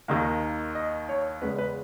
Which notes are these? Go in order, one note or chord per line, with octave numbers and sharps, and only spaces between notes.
D#2 D#3 A#3
D#5
C#5
E2 C#3 G#3 B4
B4